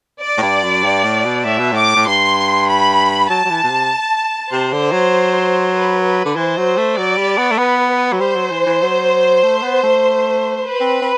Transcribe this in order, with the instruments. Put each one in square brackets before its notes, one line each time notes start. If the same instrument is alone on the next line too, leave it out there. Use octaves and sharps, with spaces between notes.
[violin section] D5
[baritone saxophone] A2
G2
F#2
G2
A2
B2
[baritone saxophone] A2 [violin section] E5
[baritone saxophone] B2
[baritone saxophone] A2 [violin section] D6
[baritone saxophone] A2
[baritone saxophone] G2 [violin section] C6
[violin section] B5
[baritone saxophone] F#3 [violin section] A5
[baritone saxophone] F#3
E3
B2
C3
[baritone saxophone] C3 [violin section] C5
[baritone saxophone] D3
F#3
[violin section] B4
B4
[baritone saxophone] D3
[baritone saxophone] E3 [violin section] C5
[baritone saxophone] F#3
A3
[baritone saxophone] F#3 [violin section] D5
[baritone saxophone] G3
B3
A3
[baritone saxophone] B3 [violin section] B4
[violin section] B4
[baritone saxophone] F#3
[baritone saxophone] G3 [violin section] C5
[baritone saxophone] F#3
E3
E3
F#3
A3
B3
A3
[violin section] B4
[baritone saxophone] C4
C4